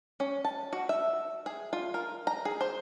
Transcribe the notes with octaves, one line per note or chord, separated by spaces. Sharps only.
C#4
A5
F#4
E5
G#4
F4
A#4
A#5
G#4
C5